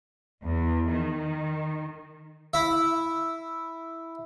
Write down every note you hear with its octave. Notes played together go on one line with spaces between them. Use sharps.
E2
D#3
E4 E5